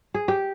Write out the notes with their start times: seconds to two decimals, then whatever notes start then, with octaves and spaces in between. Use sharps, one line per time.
0.14 G#4
0.28 G4